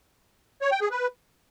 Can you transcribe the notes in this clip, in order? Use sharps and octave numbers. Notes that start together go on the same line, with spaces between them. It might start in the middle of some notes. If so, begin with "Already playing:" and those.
C#5
G5
G#4
B4